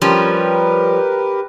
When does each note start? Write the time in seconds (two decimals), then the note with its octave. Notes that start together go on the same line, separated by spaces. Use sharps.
0.02 F3 G3 C#4 G4 A#4 B4